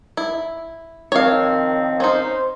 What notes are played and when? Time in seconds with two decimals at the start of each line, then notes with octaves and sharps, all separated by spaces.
0.17 E4
1.12 D#3 F3 C4 C#5 F5
2.00 C#4 D#4 C5